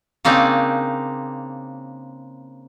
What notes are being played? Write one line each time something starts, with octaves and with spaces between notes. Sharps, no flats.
C#3 A#3 C4 D4 D#4